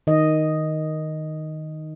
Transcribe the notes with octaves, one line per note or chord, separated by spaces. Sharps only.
D#3 D#5